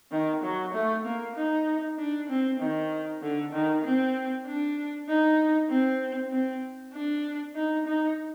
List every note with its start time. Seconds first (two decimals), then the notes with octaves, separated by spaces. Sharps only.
0.11 D#3
0.43 F#3
0.74 A3
1.05 A#3
1.35 D#4
1.98 D4
2.29 C4
2.60 D#3
3.22 D3
3.53 D#3
3.84 C4
4.46 D4
5.08 D#4
5.70 C4
6.32 C4
6.93 D4
7.55 D#4
7.86 D#4